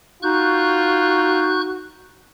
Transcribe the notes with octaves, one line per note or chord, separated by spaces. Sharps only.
D#4 F4 F#4 C#6 F#6 G6